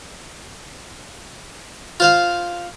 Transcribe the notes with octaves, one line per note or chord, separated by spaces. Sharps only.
F4 C5 F5